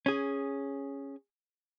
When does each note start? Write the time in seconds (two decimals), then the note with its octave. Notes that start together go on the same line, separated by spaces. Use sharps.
0.06 C#4 G#4